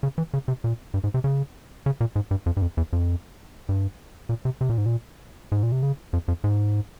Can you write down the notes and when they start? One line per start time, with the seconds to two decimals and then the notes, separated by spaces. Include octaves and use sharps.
0.03 C#3
0.18 E3
0.34 C#3
0.48 C3
0.64 A#2
0.94 G2
1.04 G#2
1.14 C3
1.24 C#3
1.86 C#3
2.01 A#2
2.16 G#2
2.31 G2
2.46 F2
2.57 G2
2.62 F2
2.77 E2
2.93 F2
3.69 G2
4.29 A#2
4.45 C3
4.61 C3
4.69 A#2
4.78 G#2
4.86 A#2
5.52 G#2
5.63 A#2
5.72 C3
5.83 C#3
6.13 F2
6.28 F2
6.44 G#2